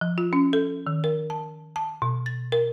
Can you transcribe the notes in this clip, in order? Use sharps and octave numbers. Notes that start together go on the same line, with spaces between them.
F3
F4
C#4
A4
D#3
A#4
A5
A5
B2
A6
A#4